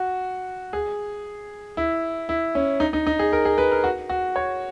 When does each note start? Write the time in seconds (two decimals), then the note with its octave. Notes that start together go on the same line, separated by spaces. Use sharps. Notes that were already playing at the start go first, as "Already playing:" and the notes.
Already playing: F#4
0.73 G#4
1.77 E4
2.29 E4
2.55 C#4
2.80 D#4
2.93 D#4
3.07 D#4
3.19 G#4
3.33 A#4
3.45 G#4
3.58 B4
3.72 A#4
3.84 F#4
4.09 F#4
4.36 C#5